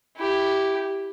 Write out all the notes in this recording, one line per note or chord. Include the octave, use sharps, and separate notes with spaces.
E4 G4